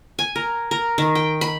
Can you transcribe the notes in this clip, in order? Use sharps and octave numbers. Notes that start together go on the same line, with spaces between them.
G#5
A#4
A#4
D#3
G5
B5